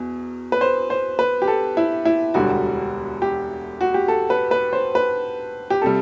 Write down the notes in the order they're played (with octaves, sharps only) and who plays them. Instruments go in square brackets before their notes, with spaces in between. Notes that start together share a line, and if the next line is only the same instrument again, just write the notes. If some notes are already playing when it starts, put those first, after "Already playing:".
Already playing: [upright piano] E2 B2
B4
C5
C5
B4
G4
A4
E4
E4
E1 D2 D3 G3 F#4
G4
F#4
G4
A4
B4
B4
C5
B4
G4
C3 G3 A4